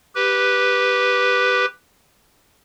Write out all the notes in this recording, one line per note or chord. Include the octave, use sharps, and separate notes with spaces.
G4 B4